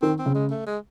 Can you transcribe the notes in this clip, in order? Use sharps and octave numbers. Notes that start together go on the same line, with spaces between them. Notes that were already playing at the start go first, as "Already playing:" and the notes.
D#3 C4
C4
C#3
G#3
A3
G#3